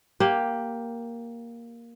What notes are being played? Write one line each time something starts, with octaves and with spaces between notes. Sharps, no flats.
A#3 G4